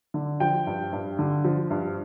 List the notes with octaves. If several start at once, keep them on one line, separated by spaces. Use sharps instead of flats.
D3
F3 G5
G2
G2
D3
F3
G2